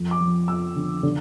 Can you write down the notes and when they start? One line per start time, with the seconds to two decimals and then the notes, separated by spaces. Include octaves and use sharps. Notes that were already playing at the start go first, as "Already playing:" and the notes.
Already playing: F2
0.11 D6
0.21 F3
0.48 F2 E6
0.76 D3
1.03 D3